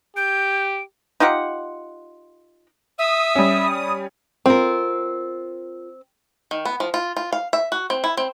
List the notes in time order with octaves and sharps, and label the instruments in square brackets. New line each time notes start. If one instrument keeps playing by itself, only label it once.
[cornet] G4 [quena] G6 [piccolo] D7
[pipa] D#4 F4 G4 F#5
[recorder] E5 [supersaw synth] D#6
[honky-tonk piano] G3 C#4
[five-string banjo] C4 [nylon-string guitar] F4 A#4
[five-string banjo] D#3
B3
F3
F4
F4
F5
E5
F#4
C4
E4
C4